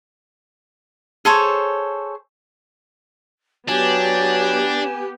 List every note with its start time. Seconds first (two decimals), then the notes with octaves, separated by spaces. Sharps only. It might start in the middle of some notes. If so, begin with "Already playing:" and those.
1.25 G#4 A4 C5 C#5
3.68 F#3 B3 D4 G4 G#5